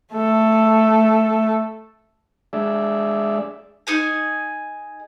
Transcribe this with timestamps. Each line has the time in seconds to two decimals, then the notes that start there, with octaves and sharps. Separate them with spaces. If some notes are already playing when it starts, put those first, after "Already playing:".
0.14 A3 A4
2.53 G#3 D4 G#4 D5 E5
3.87 D#4 G#4 G#5